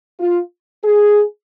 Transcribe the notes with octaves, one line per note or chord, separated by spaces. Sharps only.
F4
G#4